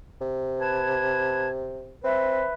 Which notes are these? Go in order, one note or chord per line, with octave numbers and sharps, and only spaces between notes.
C3
B4 A5 G#6
C4 B4 E5